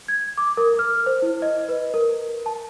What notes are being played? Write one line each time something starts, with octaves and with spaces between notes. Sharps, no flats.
G#6
D6
A#4
F6
C5
E4
D#5
B4
A#4
A5